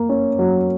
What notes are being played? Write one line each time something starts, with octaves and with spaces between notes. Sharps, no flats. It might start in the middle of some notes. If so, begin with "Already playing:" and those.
Already playing: A#3
C#4
F#3